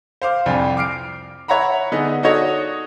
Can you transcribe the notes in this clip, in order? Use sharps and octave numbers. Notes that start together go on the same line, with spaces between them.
C5 F5 D6
C2 F2 D4 G#5 B5
D6 F6 C7 D7
C#5 E5 F#5 A#5 B5
D3 B3 D#4 G#4
D4 D#4 F#4 A4 C#5 D#5